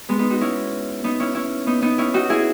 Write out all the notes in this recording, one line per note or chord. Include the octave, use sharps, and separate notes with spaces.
G#3 B3
B3 D#4
D#4 F#4
C#4 E4
B3 D#4
C#4 E4
C#4 E4
B3 D#4
B3 D#4
C#4 E4
D#4 F#4
E4 G#4